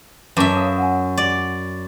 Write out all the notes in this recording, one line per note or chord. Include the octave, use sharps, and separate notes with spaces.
F#2 B4 E5 A5 D6
C#5 F5 D#6
F#5 G#5
D5